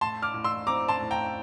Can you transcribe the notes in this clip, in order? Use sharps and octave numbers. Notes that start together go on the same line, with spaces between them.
A2 A5 C6
D6 F6
A2
C6 E6
C4 A#5 D6
A5 C6
A2
G5 A#5